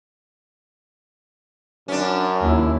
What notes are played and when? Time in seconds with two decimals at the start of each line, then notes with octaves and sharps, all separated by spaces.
1.88 F#2 C#4 D4
2.42 D#2 E4